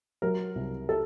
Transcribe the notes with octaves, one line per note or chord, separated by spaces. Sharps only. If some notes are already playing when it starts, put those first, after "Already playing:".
F#3 A#4
C2
A4